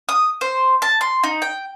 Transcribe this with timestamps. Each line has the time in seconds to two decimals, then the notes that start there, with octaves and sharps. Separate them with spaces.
0.09 D#6
0.41 C5
0.82 A5
1.01 C6
1.23 D#4
1.42 G5